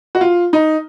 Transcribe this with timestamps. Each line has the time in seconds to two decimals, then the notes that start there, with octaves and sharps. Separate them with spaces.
0.15 F#4
0.21 F4
0.53 D#4